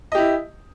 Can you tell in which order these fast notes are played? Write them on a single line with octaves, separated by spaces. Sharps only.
D#5 G4 E4